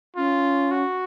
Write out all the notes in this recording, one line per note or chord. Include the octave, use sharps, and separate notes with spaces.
C#4 F4
F#4